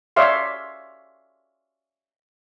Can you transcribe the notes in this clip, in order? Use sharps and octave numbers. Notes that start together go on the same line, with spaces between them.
C#5 D5 E5 F5 C6